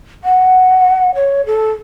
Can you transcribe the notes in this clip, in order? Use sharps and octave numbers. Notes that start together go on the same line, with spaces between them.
F#5
C#5
A4